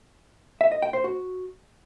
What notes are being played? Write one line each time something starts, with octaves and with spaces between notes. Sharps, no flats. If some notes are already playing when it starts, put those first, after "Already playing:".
E5
D#5
G5
C5
F#4